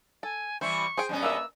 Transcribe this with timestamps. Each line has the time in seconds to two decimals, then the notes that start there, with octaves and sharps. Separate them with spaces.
0.23 A4 G#5
0.61 E3 G3 E4 C5 C#6
0.97 G#4 C5 G5
1.09 G2 B2 C#4
1.23 A#3 B4 E5 E6